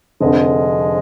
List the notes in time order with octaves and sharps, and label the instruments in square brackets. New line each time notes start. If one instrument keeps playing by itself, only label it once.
[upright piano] F1 F2 D3 [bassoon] G#3